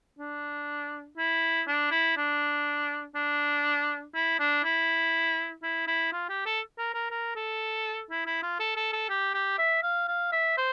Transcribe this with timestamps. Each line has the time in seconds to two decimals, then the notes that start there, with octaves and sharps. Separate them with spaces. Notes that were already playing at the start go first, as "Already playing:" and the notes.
0.19 D4
1.18 E4
1.67 D4
1.91 E4
2.17 D4
3.15 D4
4.15 E4
4.39 D4
4.64 E4
5.63 E4
5.87 E4
6.12 F4
6.29 G4
6.45 A4
6.78 A#4
6.94 A#4
7.11 A#4
7.36 A4
8.10 E4
8.26 E4
8.42 F4
8.59 A4
8.76 A4
8.93 A4
9.09 G4
9.34 G4
9.58 E5
9.83 F5
10.08 F5
10.32 E5
10.57 C5